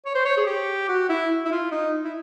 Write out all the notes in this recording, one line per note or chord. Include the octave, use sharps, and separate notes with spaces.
C#5
C5
C#5
G#4
G4
F#4
E4
E4
F4
D#4
E4